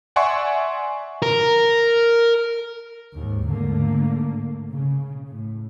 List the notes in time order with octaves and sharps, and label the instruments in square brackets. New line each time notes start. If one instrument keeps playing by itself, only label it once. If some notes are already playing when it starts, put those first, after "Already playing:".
[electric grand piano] D5 E5 F#5 G#5 C6 C#6
[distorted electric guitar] A#4
[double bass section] D#2 G#2
G#2 D3 A3 A#3
C#3
A2